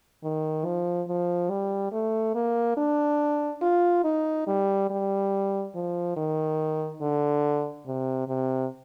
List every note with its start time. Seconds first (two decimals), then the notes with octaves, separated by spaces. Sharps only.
0.24 D#3
0.65 F3
1.09 F3
1.50 G3
1.92 A3
2.35 A#3
2.77 D4
3.62 F4
4.04 D#4
4.47 G3
4.90 G3
5.75 F3
6.17 D#3
7.01 D3
7.86 C3
8.28 C3